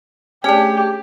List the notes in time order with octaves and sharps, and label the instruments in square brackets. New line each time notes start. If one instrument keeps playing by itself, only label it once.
[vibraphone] A3 G#4 [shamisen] C#4 D4 [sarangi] G4